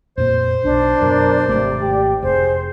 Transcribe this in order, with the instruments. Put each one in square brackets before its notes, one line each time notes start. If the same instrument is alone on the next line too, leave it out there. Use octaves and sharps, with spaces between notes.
[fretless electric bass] F2 A#2 A#3 [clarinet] C5
[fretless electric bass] B1 [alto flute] D4
[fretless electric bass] F#2 B2 [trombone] A#4
[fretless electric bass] G#1 A3 [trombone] C3 [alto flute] D5
[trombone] G4
[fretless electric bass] F1 [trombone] G#4 [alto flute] C5